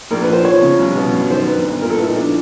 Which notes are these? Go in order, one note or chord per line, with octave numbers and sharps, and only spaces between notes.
A#1 A#4
B4
F3
C5
F3 C#5
C#3
C2
B2
F#2
D#3 C5
G1 B4
G1
A#2 A#4
A4
B3 E4
D#4
F3 D4